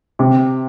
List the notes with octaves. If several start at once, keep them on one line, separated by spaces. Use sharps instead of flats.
C3